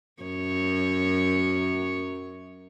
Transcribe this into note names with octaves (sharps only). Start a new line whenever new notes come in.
F#2 C#5